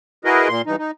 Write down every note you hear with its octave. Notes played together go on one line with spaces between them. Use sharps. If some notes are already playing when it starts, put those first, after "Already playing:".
E4 F#4 G#4 A#4 B4 D#5
A#2 A#3 C6
G2 E3 D#4
D#4